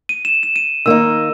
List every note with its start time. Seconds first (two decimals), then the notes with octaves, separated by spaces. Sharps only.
0.09 D#7
0.25 E7
0.43 E7
0.56 D#7
0.86 D#3 A#3 D#4 E6